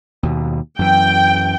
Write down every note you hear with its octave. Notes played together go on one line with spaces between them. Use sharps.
D#2 B2
F#2 E3 G5